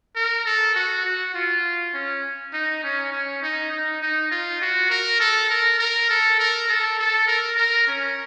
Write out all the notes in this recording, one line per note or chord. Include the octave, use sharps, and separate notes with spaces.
A#4
A4
F#4
F#4
F4
C#4
D#4
C#4
C#4
D#4
D#4
D#4
F4
F#4
A#4
A4
A#4
A#4
A4
A#4
A4
A4
A#4
A#4
C#4